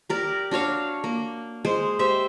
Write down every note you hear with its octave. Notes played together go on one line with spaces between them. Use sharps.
G4 A#4 D5
D4 F#4 C#5 F5
A#3
G#3 C5
G4 C5 E5